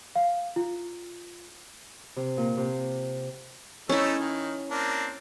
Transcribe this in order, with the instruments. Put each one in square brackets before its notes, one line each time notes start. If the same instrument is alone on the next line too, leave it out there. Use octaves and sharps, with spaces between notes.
[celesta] F5
F4
[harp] C3
A#2
C3
[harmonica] A3 D#4 E6 [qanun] C#4 E4
[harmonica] D#3
A#3 C4 D4